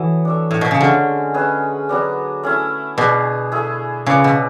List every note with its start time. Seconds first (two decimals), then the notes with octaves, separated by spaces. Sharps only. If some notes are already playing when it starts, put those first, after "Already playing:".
Already playing: E3 F#3 B3 A4
0.25 D4 A4 C#5 E5
0.51 A2
0.61 B2
0.71 C#3
0.81 D3 G#3 C#4 F#4
1.34 C#4 G#4 B4 E5
1.89 F#3 B3 D4
2.43 A3 C#4 E4
2.97 B2 B3 D4 G#4 B4
3.52 A3 E4 G#4
4.06 C#3 E4 B4 D5
4.24 B2